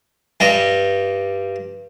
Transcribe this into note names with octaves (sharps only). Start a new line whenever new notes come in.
G2 G3 D#5